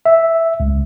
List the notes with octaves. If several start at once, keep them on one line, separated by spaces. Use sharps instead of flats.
E5
C#2